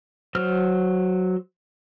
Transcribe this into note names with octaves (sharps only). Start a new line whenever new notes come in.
F#3 C5 F6